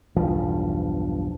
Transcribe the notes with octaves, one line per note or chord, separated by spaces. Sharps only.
B1 E2 G2 F3